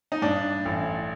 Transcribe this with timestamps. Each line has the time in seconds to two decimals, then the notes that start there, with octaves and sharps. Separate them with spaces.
0.12 D#4
0.22 G2 D4
0.65 A1